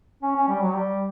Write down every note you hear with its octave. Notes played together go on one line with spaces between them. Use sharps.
C#4
C#4
G3
F#3
G3